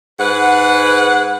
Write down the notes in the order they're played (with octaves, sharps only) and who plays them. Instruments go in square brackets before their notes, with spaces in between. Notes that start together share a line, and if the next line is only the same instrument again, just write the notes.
[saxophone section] G#2 B4 F#5